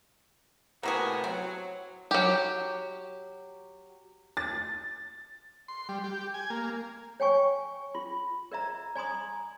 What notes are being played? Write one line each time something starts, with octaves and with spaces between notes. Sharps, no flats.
A2 C3 A#3 B3 F#4 G#4
F#3 C4
F#3 G4
A6
C6
G3
G4
G#5
A#3
C#5 G5 G#5 C#6
F4 C6
A#4 D5 E5 A#5
D5 G#5 A#5 C6 D#6